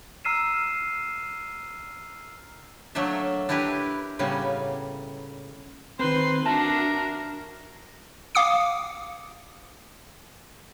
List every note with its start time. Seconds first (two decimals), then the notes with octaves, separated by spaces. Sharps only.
0.25 A#5 E6 F6 C7 D#7 E7
2.95 F#3 A3 A#3 D4 E5
3.49 D4 E4 G4 A#4 B4
4.19 A2 C#3 G3 A#3 B3
5.99 D#3 C4 B4 C6
6.46 D4 F#4 A#4 E5 A5
8.35 F5 D6 D#6 C#7